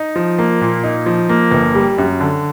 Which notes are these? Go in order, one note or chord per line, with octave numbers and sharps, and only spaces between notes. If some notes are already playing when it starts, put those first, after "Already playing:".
Already playing: D#4
F3
A#3
A#2
D#4
F3
A#3
G1
G3
F#2
D3